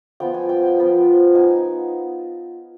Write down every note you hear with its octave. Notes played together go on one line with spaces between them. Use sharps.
F3 B3 F4 G5
G#5
G5
G5
F3 B3 F4
B3 D#4 G#5